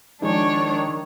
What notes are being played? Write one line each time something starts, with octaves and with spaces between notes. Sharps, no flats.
D#3 F3 G#3 D4 D#4 C#5